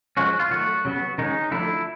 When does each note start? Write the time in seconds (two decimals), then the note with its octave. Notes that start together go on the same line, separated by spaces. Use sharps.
0.17 F3 G#3 C#4 F#4
0.39 F4
0.51 D#3 F#3 A3 F#4
0.85 C#3 F#3 B3
1.18 D#3 G#3 C#4 D#4
1.51 D3 F3 A3 D4 E4